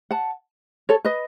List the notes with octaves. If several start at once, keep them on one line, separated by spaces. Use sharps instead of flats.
F#5 A5
A4 C#5
B4 D#5